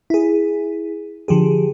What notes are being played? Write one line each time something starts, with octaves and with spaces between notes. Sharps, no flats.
E4 G#4
D3 F3 G4 G#4